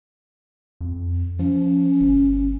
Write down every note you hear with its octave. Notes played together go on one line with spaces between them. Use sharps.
F2
F3 C#4
G1